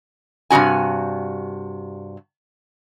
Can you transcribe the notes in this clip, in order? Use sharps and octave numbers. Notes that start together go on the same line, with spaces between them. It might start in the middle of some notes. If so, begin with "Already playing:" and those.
G2 C3 D#3 F#4 G#5